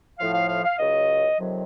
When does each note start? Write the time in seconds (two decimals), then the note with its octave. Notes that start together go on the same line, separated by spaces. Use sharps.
0.19 A2 F3 F5
0.33 F5
0.49 F5
0.64 F5
0.79 C#2 C#3 F#3 D#5
1.38 F2 C3 D#3 F#3